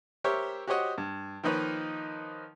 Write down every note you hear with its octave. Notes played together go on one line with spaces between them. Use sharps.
G4 A#4 C5 C#5 E5
F#4 G4 C5 C#5 D#5 F#5
G2
D#3 F3 A#3 D#4 B4 C#5